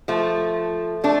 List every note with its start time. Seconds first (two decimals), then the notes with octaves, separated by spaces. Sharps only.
0.08 F3 A3
1.04 A3 D4